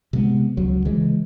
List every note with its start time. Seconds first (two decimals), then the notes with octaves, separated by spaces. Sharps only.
0.13 C3 G#3 B3
0.57 C#2 F#3
0.85 C#3 E3 G#3